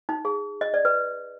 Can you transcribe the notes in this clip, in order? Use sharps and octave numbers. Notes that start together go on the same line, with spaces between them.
D#4
G#4
D#5
D5
B4